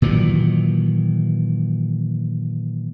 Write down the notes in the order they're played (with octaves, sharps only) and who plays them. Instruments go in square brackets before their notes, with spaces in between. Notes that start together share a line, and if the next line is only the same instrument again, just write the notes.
[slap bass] A#2 D#3 E3 F#3